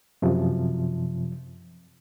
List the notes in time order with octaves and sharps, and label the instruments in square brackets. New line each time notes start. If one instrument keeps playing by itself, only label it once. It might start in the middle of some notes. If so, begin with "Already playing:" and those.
[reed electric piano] F#2 C3 F3